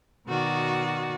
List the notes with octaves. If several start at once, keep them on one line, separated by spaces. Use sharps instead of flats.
B2 D#3 F#4 D5